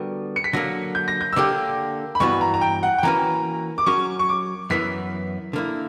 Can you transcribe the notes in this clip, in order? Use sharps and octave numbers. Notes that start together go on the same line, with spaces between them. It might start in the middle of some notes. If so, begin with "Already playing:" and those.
Already playing: D3 G3 B3 F#4 A#4
C#7
B6
D3 F#3 A#3 A#6
G6
A#6
G6
E6
D3 A#3 D4 G4 D6
B5
G2 E3 B3 F#4 C#6
A#5
A#5
G5
F#5
G5
E3 A#3 C#4 F#4 B4 A#5
D6
F#3 C#4 F#4 A#4 C#6
C#6
D6
F#2 E3 B3 E4 A#4 B6
D3 A#3 E4